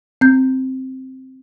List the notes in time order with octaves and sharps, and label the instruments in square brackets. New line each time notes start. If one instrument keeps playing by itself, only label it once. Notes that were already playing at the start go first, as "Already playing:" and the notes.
[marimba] C4 G6